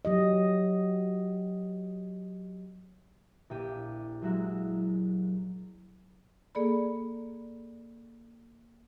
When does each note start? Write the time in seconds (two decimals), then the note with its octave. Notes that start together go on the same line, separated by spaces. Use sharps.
0.05 F#3 G4 D#5
3.50 A#1 E4 G4 D#7
4.22 F#3 G#3 E4 F#4 E5
6.55 A#3 G#4 A4 D5 B5